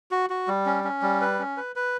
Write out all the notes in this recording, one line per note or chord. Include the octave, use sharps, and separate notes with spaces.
F#4
F#4
G3
C#4
C#4
G3
B4
C#4
B4
B4